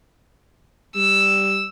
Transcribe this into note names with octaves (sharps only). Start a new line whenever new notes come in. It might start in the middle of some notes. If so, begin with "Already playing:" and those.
G3 E6